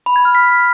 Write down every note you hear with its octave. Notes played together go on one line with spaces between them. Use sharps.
B5
G#6
F6
B6